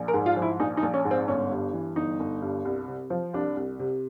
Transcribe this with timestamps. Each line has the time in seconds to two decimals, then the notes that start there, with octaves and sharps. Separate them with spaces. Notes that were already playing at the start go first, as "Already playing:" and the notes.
Already playing: A#1
0.08 A#4
0.14 G#2
0.26 F4
0.37 F3
0.42 E4
0.59 A#1 D#4
0.77 D#4
0.83 A#1
0.94 C#4
1.05 G#2
1.11 C4
1.28 G1 C#4
1.52 G2
1.73 E3
1.96 G1 D#4
2.20 G1
2.42 G2
2.65 C2
2.88 C3
3.10 F3
3.34 C2 D4
3.56 C2
3.79 C3